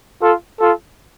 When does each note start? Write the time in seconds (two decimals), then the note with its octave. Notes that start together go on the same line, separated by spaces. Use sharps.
0.21 F4 A4
0.60 F4 A4